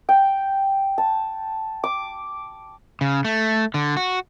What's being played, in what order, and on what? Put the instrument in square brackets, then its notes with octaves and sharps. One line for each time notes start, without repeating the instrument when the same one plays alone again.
[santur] G5
A5
D6
[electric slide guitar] C#3
A3
D3
F#4